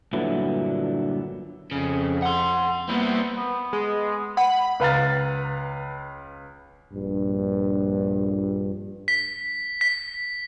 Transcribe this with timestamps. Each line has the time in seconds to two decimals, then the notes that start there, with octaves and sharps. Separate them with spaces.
0.13 G2 A#2 D3 F#3 B3 E4
1.71 F2 C#3
2.22 F#5 C6
2.89 G3 A#3 B3 E4
3.37 B3
3.73 G#3
4.37 F#5 B5
4.80 C#2 B4 F5 A#5 F6 A6
6.92 A#1 G2
9.08 B6
9.81 B6